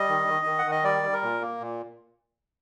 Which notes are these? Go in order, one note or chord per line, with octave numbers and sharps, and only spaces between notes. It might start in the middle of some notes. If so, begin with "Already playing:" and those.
Already playing: G3 D#5
D#3
D#3
D#3
F#5
D#3
D#5
G3 D5
G3
A#4
A#2
A#3
A#2